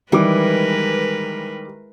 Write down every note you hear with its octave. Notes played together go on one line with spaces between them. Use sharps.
D#3 E3 G3 G#3 A#4 B4 D6